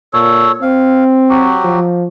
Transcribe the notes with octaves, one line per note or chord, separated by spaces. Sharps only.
A#2 A4 C#5
C4 F5
F#3 F#4 G4
F3